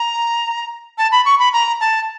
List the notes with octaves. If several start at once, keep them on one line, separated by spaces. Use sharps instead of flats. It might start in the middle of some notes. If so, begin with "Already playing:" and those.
Already playing: A#5
A5
B5
C#6
B5
A#5
A5